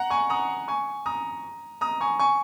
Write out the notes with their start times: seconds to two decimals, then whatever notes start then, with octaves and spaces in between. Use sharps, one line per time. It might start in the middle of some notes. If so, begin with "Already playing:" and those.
Already playing: F#5 A#5
0.10 G#5 C#6
0.30 A#5 D#6
0.68 G#5 C#6
1.06 A#5 D#6
1.81 A#5 D#6
2.01 G#5 C#6
2.20 G#5 C#6